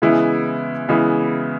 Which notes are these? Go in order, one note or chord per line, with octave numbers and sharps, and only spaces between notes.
C#3 E3 G#3 B3 E4
C#3 E3 G#3 B3 E4